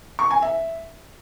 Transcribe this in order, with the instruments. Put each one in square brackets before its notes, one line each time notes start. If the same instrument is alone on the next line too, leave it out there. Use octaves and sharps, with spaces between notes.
[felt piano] C#6
G#5
E5